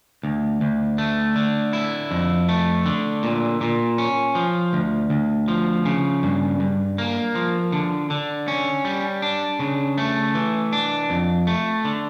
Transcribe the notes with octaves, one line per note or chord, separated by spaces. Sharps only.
D2
D2
A3
D3
E4
F2
A3
D3
A#2
A#2
C#4
F3
D2
D2
F3
C#3
G2
G2
A#3
F3
D3
D3
C#4
G3
D4
C#3
A3
E3
D4
F2
A3
D3